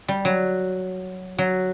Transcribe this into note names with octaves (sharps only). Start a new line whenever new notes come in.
G3
F#3
F#3